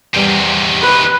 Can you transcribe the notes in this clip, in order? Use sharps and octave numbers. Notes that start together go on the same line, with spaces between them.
E2 C3 D#3 G3
B4